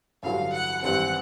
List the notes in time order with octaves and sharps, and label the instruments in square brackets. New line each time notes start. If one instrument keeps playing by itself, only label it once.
[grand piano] A1 G2 D3 F#3 [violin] F5
[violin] F#5
[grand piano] G#1 G2 E3 G3 C4 [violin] F#5